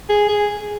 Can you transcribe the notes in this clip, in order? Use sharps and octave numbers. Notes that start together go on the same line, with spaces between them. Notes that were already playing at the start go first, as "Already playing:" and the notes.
G#4
G#4